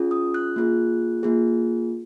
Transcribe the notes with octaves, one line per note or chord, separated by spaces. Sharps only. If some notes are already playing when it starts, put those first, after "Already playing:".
Already playing: C#4 F4 G#4
D#6
F#6
A#3 F4 G#4
A#3 F4 G#4